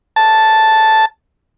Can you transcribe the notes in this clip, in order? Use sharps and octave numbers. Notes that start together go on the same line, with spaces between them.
A5